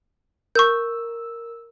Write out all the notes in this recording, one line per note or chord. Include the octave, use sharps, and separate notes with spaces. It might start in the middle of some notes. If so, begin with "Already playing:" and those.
A#4 C#6 E6 G6